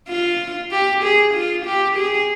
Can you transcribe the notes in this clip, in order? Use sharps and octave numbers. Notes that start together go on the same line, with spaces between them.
F4
G4
G#4
F4
G4
G#4